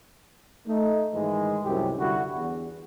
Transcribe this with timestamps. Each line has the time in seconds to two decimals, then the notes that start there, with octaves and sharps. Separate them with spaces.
0.67 A3 D#4
1.13 G#2 D#3 E3 G#3
1.64 C2 F#2 A2 C3 G4
1.98 D3 G3 E4 F#4
2.35 E2